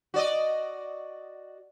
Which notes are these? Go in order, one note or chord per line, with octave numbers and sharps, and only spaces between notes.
F#4 D5 D#5